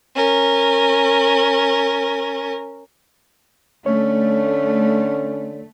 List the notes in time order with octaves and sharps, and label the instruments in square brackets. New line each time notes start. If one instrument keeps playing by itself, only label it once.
[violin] C#4 A#4
[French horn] D3 [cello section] A3 [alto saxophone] C#4 [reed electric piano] C#5